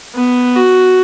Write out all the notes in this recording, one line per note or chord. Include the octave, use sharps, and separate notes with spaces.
B3
F#4